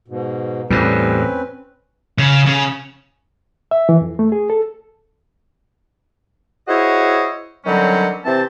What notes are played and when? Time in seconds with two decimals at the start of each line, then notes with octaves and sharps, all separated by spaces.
0.08 G#2 B2
0.70 E2 A2 G3 C4 C#4 B4
2.18 C#3
2.46 C#3
3.71 E5
3.89 E3
4.01 F2
4.19 A3
4.32 G#4
4.50 A4
6.68 E4 F#4 G#4 C5 C#5 D#5
7.65 D3 D#3 F#3 G3 C4 C#4
8.25 C3 E3 C4 C5 A5